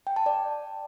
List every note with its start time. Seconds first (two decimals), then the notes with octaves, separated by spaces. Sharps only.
0.07 G5
0.16 A5
0.26 D5